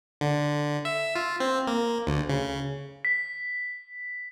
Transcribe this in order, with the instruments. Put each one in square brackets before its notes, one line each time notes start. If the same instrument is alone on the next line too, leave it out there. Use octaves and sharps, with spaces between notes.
[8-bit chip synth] D3
E5
F4
C4
A#3
D2
C#3
[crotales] B6